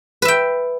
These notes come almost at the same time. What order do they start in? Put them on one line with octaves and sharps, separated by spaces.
B4 E5 G5